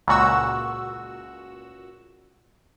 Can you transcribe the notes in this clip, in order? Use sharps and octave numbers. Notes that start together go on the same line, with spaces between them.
C#2 A#2 F#4 E6